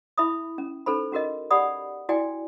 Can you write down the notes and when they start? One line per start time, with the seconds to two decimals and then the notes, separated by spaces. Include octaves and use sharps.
0.18 E4 E5 B5 D#6
0.58 C#4
0.86 C#4 D#4 A4 C5 B5
1.12 C#4 F#4 A#4 D#5
1.51 G4 D5 F#5 B5 D#6
2.09 E4 F#4 D5 G5 G#5